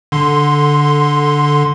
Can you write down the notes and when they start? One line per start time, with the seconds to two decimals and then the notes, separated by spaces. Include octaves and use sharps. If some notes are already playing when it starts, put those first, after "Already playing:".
0.12 D3 C6